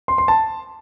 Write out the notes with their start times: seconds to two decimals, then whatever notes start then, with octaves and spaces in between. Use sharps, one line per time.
0.08 C6
0.18 C6
0.28 A5